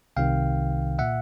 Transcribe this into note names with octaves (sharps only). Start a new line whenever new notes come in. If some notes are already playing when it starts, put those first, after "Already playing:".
C2 C3 D#3 F5 G5
A#2 E5 F#5